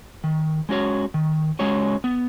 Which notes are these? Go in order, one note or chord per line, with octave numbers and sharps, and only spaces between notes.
D#3
G#3 C#4 F#4 C#5
D#3
G#3 C#4 F#4 C#5
B3